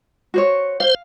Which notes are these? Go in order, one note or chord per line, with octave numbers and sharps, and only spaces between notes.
F#4 C5 C#5
C5 F5